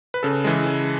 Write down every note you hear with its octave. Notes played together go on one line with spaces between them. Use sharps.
B4
C#3 A4
E3 G#3
C#3